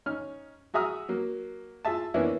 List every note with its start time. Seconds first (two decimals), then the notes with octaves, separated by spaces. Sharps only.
0.06 C#4 D#4 F6
0.74 F#4 G#4 E5 A#5 D#6 F6
1.09 F#3 A#3
1.85 F4 G#4 E5 A5
2.14 E3 A#3 B3 C#4 D4 E4